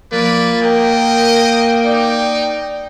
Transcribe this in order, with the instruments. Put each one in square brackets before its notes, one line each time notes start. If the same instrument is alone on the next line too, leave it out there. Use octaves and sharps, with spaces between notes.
[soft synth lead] F3 [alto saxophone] A#3 [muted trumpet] B4 [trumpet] D5
[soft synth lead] A#4 [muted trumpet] D#5 [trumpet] G5
[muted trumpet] D#4 [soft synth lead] D5